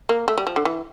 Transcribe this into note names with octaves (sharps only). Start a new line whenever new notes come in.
A#3
A3
G3
F3
D3
E3